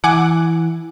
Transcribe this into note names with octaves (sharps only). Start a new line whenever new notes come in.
E3 F#5 G#5 D6